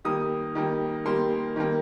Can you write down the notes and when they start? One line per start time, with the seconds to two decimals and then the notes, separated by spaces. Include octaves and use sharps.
0.05 D#3 G3 A#3 D#6
0.55 D#3 G3 A#3
1.06 D#3 G3 A#3 C6
1.56 D#3 G3 A#3